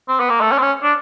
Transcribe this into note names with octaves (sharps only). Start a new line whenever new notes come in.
C4
B3
A#3
A3
C#4
C4
C#4
D4